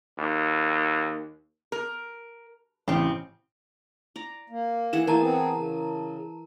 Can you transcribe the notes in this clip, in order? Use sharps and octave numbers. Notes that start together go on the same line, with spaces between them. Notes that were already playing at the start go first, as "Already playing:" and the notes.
D#2
A#4
A1 C#3 C4
D5 A#5
A#3
E3 G#4 F#5 E7
E3 A3 A#3 A#4 A5 A#5
B3 C4 G#4
C#3